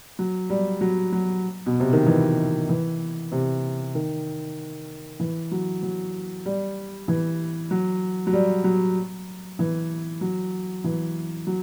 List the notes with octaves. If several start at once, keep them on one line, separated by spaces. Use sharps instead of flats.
F#3
G3
F#3
F#3
B2
C3
D#3
E3
E3
C3
D#3
E3
F#3
F#3
G3
E3
F#3
F#3
G3
F#3
E3
F#3
E3
F#3